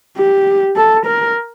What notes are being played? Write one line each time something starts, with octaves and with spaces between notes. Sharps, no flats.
G4
A4
A#4